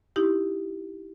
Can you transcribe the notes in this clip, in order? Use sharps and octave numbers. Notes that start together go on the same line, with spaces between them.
D#4 E4 G4